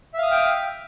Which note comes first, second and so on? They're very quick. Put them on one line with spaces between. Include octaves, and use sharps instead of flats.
E5 F5 D#6 F6 G5